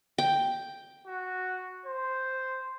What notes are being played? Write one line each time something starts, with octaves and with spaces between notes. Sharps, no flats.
G5
F#4
C5